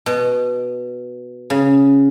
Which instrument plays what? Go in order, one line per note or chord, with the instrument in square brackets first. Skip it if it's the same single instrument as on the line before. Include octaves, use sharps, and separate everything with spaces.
[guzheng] B2
C#3